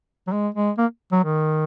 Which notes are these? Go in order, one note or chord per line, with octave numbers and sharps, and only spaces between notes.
F#3
G#3
G#3
A#3
F#3
D#3